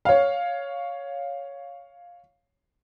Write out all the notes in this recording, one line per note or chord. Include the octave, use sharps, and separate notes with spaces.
C#5 F5